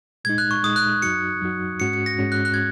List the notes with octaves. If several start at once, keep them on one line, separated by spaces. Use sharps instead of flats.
A#2 G#3 D#4 G#6
F#6
C#6
A#2 G#3 D#4 D#6
F#6
F#2 F#3 D#4 F#4 C#7
F#2 F#3 D#4 F#4
G#2 G#3 C#4 F#4 C#7
C#7
A#6
G#2 G#3 C#4 F#4
F#6
F#6
G#6